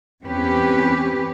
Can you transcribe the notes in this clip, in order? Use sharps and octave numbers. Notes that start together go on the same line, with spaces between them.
E2 C4 C#4 G4 B4